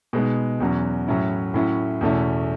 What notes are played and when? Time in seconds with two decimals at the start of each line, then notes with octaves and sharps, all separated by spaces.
0.13 B2 G#3 B3 D#4
0.60 E2 B2 F#3 C#4
1.07 A2 F#3 C#4 E4
1.54 A2 F#3 C#4 E4
2.01 E2 B2 A3 C#4 E4